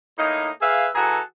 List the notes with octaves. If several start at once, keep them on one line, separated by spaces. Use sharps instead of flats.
A2 A#3 D#4
G#4 B4 E5 F5
E3 F#4 G#4 A4 A#5